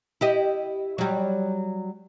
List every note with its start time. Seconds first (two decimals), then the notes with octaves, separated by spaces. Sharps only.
0.21 E4 G4 D#5
0.98 F#3 G3